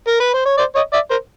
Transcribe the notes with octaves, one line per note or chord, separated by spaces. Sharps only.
A#4
B4
C5
C#5
C5 D5
C#5 D#5
D5 E5
A#4 C5